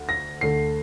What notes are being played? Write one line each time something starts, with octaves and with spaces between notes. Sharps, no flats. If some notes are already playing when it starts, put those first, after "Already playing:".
Already playing: D2
A#6
D2 D3 A3 C7